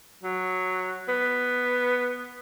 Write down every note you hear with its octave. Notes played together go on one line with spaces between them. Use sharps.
F#3
B3